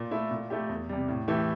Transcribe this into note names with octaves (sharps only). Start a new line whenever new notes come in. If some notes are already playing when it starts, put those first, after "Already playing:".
Already playing: A#2
A3 E4
A#2
A3 E4 G4
E2
C3 G3
A2
E3 A3 E4 G4